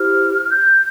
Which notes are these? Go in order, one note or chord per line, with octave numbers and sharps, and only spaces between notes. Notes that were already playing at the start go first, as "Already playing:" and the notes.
Already playing: E4 G4 C5 F6
G6